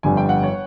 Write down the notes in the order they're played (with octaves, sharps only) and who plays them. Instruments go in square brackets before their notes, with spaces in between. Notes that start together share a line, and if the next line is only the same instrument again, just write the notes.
[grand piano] G1 F2 D3 G3 [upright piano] G#5
[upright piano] G5
F#5
C#5